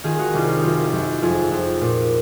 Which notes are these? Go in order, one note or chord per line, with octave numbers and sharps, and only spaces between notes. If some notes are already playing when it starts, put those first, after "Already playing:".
D#3 F4 G#4
D#4 F#4
C2 C#4 F4
C#4 F4
F#2 C#4 D#4 F4
F#2
F2 F4 G#4
F2
A#2